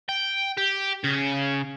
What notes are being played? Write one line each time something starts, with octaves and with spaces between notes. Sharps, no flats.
G5
G4
C#3